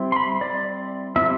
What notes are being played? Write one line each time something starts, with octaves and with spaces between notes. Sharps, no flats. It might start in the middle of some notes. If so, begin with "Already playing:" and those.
Already playing: G3 C4 E4
C6
B5
D5
G3 C4 E4 E5